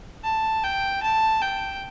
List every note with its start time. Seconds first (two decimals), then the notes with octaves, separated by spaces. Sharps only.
0.24 A5
0.64 G5
1.03 A5
1.42 G5